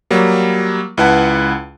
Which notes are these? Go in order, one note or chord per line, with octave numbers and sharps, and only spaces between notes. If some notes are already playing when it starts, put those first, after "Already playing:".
F#3 G3 A#3
C#2 E4 B4 F#5 A5